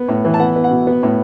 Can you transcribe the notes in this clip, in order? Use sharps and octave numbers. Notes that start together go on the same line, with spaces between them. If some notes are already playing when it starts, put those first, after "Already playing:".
Already playing: B3
A2
E3
A5
B3 F#5
B3
F#5
B2
B3
A2